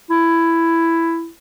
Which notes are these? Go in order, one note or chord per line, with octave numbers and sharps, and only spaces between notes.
E4